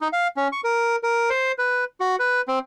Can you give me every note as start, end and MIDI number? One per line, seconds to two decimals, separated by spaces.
0.01 0.08 63
0.13 0.28 77
0.37 0.48 61
0.52 0.61 85
0.64 0.96 70
1.03 1.30 70
1.30 1.52 72
1.58 1.85 71
2.00 2.16 66
2.19 2.42 71
2.48 2.59 60